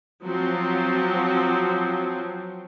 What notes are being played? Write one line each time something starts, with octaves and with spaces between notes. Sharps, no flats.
F3 F#3 C4